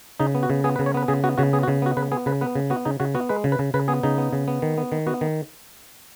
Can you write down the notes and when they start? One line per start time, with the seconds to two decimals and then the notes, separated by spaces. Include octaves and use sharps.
0.20 C#3 D#4
0.35 B3
0.43 F#4
0.50 C#3
0.64 B3 G#4
0.76 B4
0.79 C#3
0.86 C#5
0.94 B3 B4
1.08 C#3 G#4
1.24 B3 F#4
1.38 C#3 F#4
1.53 B3 G#4
1.63 F#4
1.68 C#3
1.82 B3 F#4
1.97 C#3 B4
2.12 B3 G#4
2.26 C#3 B4
2.41 B3 B4
2.55 C#3
2.70 B3 F#4
2.85 C#3 D#4
3.00 C#3 F#4
3.15 B3 F#4
3.29 G#3 B4
3.44 C#3
3.52 B4
3.59 C#3
3.74 C#3 B4
3.88 B3 G#4
4.03 C#3 D#4
4.18 B3
4.33 C#3
4.48 B3
4.62 D#3
4.78 B3
4.92 D#3
5.07 B3 F#4
5.21 D#3